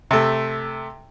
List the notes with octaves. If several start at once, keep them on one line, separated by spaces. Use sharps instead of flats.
C3 A3